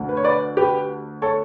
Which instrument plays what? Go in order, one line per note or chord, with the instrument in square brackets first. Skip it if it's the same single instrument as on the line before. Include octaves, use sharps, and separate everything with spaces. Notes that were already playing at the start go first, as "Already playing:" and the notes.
Already playing: [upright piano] D2 D3
B4
C#5
B4 D5
G4 B4
A4 C#5